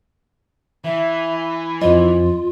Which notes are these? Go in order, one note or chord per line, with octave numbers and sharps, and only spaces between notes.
E3 E5
F2 F3 F4 D#5